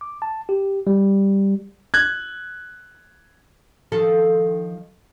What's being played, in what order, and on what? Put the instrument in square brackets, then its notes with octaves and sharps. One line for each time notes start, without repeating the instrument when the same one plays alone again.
[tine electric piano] D6
A5
G4
G3
[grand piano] F#6 G#6
[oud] D#3 F3 A4